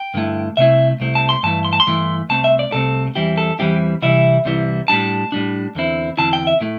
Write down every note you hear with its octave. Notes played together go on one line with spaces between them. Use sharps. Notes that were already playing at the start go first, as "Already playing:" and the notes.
Already playing: G5
G2 D3 A3 E4
C2 C3 A3 C4 E4 E5
C2 C3 A3 C4 E4
A5
C6
G2 E3 A3 E4 A5
C6
A5
C6
G2 E3 A3 E4
C2 C3 A3 C4 A5
E5
D5
C2 C3 A3 C4 A4
E2 E3 G3 C4 E4 G4
A4
E2 E3 G3 C4 E4 G4
C2 C3 E3 G3 E4 E5
C2 C3 E3 G3 E4
A2 G3 D4 A5
A2 G3 D4
E2 D3 C4 E4
E2 D3 C4 E4 A5
G5
E5
A2 A3 E4